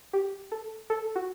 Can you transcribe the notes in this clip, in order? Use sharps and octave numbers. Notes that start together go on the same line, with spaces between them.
G4
A4
A4
F#4